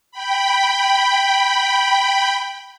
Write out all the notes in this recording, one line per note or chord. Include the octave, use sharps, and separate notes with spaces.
G5 B5